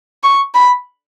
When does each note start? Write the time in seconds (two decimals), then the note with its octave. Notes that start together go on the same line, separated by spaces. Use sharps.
0.23 C#6
0.54 B5